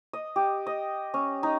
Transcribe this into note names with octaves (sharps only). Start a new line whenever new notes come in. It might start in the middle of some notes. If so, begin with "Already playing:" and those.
D#5
G4
D#5
C#4
D#4